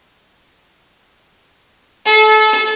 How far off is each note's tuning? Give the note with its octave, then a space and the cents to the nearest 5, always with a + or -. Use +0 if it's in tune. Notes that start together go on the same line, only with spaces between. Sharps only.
A4 -30